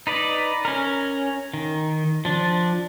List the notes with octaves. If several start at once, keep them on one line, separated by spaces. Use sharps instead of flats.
D#4 B4 D5
C#4 A#4
D#3
F3 D4